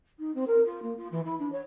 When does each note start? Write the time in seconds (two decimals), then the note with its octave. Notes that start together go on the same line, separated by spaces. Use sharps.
0.19 D#4
0.34 C4
0.47 A#4
0.65 F4
0.82 A#3
0.97 F4
1.11 E3
1.25 E4
1.39 D4
1.52 C#5